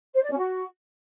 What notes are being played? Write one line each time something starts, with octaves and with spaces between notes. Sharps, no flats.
C5
D5
C#4
F#4